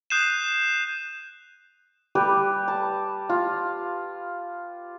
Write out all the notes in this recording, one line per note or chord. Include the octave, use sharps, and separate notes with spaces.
D#6 F#6 G6 C7 D#7 E7
G3 G4 B4 D5
A5
F4